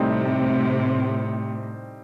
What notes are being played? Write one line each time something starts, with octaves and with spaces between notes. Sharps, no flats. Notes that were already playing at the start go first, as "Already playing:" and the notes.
Already playing: A2 C3 G3 C4 D#4 A4 C5